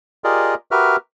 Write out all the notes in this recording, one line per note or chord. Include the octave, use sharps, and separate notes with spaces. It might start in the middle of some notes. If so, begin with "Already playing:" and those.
F4 G4 G#4 A#4 D5 D#5
F#4 G4 A#4 B4 E5 F6